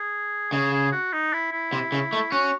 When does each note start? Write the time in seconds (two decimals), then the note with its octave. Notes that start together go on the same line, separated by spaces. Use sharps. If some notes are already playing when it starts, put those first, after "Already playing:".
Already playing: G#4
0.52 C#3 G#4
0.73 G#4
0.92 F#4
1.13 D#4
1.33 E4
1.52 E4
1.73 C3
1.92 C#3
2.13 A3
2.32 C#4 F#4